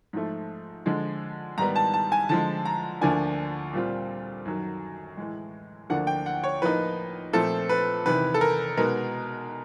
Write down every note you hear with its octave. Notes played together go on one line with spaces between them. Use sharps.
G#2 F3 A3
D3 F3 G#3
G#2 D#3 G3 B3 A#5
A5
A5
G#5
D3 F3 G#3 A5
A#5
D2 D3 F3 A#3 D4 G#5
A#2 G3 C4 F4
F#2 D#3 F#3
A2 E3 G#3
D2 D3 F3 A#3 D4 F#5
G5
F#5
C#5
A2 F3 A#3 D#4 B4
A#2 F3 A3 C4 A4
B4
E2 C3 D#3 B4
A4
A#4
B2 G#3 B3 D#4 A#4